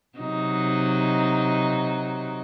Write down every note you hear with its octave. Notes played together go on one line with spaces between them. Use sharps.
C3 F#3 D#4